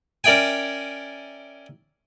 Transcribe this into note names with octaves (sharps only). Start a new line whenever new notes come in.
C#4 A#4 D5 E5 G5 G#5